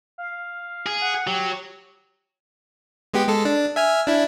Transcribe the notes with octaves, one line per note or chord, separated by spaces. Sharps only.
F5
G#4
F#5
F#3 G4
G#3 B3 G4
G#3 A4
D4
E5 G#5 F6
D4 E4